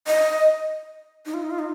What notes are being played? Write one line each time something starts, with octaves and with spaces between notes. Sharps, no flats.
D#5
D#4
F4
D#4
F4
D#4